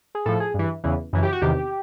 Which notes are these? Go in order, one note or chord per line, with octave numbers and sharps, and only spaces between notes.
G#4
A2 F3 A4
G#4
G2 E3
E2 C#3 E3
F#2 C#3 E3
G4
F#4
E2 C3 D#3 G4